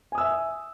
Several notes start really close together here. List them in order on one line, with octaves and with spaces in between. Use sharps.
G#5 D#6 E6 E5